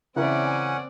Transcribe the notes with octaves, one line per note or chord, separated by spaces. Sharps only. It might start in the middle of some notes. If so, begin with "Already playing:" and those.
C#3 E3 C4 C#4 A#4 D5 E5 F#5
G#5